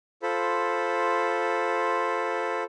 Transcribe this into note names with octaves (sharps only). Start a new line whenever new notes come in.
F4 A4 C5 B5